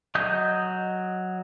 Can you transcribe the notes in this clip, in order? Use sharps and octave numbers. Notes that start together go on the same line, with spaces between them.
F#3 D#5 D#6 G6